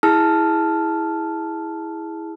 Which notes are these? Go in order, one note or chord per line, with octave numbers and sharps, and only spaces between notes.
E4 G#4 A5 E6 F6